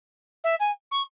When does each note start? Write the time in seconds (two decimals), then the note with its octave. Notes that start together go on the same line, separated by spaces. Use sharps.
0.44 E5
0.60 G#5
0.91 C#6